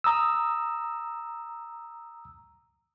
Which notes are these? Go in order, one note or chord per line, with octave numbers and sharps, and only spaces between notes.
A#5 D#6 E6